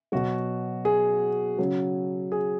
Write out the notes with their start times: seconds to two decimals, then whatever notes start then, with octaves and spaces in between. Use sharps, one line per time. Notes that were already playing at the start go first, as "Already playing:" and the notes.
0.12 B2 F#3 F#4
0.85 G#4
1.59 C#3 F#3
2.32 G#4